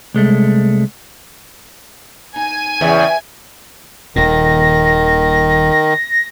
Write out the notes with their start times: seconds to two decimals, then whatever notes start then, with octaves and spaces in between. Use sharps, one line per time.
0.14 C2 G#3 A3
2.36 D#4 G#5
2.81 E2 C#3 B4 E5 G5
4.16 D#1 A#2 D#3 A#6